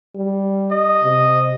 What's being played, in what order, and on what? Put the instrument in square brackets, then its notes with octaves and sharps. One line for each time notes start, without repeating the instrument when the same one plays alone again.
[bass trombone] G3
[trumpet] D#5
[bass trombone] C3